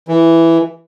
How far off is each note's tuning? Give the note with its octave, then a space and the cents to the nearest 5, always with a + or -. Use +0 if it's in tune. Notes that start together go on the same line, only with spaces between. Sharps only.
E3 +5